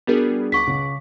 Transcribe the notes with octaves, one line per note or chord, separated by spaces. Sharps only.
G3 B3 D4 F#4 G#4 A#4
C#2 F#5 C#6 D6 B6
C#3